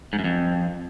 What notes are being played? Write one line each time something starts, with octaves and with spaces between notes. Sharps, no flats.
G#2
F#2
F2